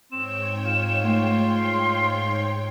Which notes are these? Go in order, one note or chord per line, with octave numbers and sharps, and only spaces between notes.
G#2 C4 C#5 G5 E7
F4
A3 C6